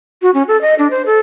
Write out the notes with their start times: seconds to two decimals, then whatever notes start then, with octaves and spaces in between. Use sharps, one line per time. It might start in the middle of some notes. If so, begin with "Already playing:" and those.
0.22 F#4
0.34 C#4
0.48 A4
0.61 D#5
0.79 D4
0.91 C5
1.06 A4